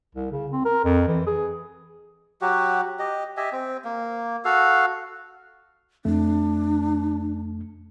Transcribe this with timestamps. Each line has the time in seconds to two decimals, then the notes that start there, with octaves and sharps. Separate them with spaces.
0.15 C2
0.32 C#3
0.51 C4
0.65 A#4
0.85 F2
1.08 E3
1.27 G#4
2.41 F#3 F#4 G4
2.99 G4 D#5
3.37 G4 D#5 E5 G#5
3.52 C4
3.85 A#3
4.45 F#4 A4 F5
6.05 F2 A3 D4